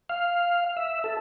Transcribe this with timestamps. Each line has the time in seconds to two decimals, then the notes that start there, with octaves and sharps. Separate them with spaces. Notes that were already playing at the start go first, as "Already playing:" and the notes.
0.09 F5
0.77 E5
1.04 A4